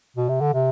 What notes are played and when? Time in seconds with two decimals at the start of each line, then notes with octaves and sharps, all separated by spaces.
0.16 B2
0.29 C3
0.41 D3
0.54 C3